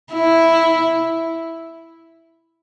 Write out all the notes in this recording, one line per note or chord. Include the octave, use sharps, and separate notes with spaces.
E4